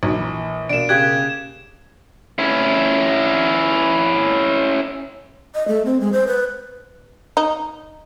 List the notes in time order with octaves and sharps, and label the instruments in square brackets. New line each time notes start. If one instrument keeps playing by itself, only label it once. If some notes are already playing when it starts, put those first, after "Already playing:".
[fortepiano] A#1 [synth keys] F#3 D#4
[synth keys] E3
[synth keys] B2 A#3 [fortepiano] D4 [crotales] D7 E7
[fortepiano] C#3 G4 F#6 [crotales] G#6
[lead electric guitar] C#4 E4
[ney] D#5
A3
C4
G#3
C5
B4
[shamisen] D#4